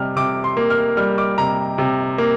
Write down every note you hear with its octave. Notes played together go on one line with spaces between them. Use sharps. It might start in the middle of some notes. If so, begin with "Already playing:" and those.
Already playing: C3 G3 F6
C3 D6
C6
A#3
F6
G3 F6
D6
C3 A#5
C3
A#3